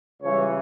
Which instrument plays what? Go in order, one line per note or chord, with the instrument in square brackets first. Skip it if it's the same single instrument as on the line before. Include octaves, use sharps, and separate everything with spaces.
[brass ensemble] C#2 C#3 E3 G3 C#5